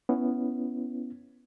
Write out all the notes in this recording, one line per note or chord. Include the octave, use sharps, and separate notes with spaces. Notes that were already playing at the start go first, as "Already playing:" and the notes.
B3 C#4 E4